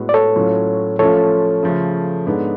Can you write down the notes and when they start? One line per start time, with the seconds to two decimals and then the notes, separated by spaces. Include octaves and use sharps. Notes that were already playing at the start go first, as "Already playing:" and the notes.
Already playing: A2 G#3 B3 F#4
0.09 D5
0.14 A4 C#5
0.35 A2 F#3 C#4 F4
0.99 F3 A3 C#4 F4 A4 C#5
1.63 C#3 F3 A3
2.26 G#2 G#3 B3 D4